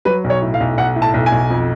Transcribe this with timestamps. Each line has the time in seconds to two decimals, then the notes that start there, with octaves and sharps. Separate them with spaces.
0.05 F#3 B4
0.24 B1
0.30 C#5
0.42 A2
0.54 F5
0.60 B1
0.78 B1 F#5
0.96 A2
1.02 A5
1.14 B1
1.26 G#5
1.32 B1
1.50 F2